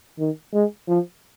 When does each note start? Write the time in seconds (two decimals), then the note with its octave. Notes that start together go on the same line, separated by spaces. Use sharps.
0.19 D#3
0.54 G#3
0.88 F3